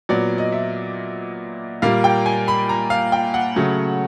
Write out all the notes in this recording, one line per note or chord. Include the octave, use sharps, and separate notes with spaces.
A#2 F#3 B3 D5
D#5
E5
A#2 G3 A#3 F5
G5
G#5
B5
A#5
F5
G5
F#5
C#3 F#3 A3